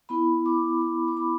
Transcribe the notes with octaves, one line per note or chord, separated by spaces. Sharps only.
B3 E4 B5
D6
B5
D6
B5